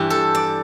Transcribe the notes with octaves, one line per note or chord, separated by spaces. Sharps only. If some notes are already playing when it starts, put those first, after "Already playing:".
Already playing: G2 E3 G4
A4
D5